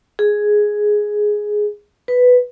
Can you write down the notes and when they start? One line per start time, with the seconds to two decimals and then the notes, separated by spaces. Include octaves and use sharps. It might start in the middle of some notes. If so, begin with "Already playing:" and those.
0.19 G#4
2.08 B4